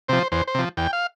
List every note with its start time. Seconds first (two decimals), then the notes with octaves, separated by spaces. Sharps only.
0.08 C3 F3 C5
0.32 E2 C5
0.48 C5
0.55 C3 F3
0.77 E2 G5
0.93 F5